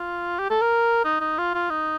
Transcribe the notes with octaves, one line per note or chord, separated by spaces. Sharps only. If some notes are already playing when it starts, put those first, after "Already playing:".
Already playing: F4
G4
A4
A#4
D#4
D#4
F4
F4
D#4